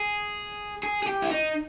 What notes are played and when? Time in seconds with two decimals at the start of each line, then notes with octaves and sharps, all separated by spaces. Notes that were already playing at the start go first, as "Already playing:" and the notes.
Already playing: G#4
0.83 G#4
1.03 G#4
1.07 G4
1.22 E4
1.31 D#4